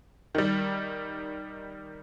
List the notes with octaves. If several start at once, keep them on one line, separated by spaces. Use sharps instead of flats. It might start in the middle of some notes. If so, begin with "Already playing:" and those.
D#3 G3